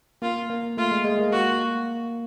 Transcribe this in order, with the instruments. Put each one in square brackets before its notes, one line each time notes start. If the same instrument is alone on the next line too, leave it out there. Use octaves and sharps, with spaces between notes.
[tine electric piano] A#3 [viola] F4
[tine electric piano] A#3
[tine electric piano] A3 [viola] F4
[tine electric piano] G#3
G#3
A#3
[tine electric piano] A#3 [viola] F#4